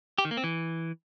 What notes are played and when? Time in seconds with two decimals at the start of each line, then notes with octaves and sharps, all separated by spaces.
0.18 G4
0.25 D#3
0.31 A#3
0.37 C4
0.44 E3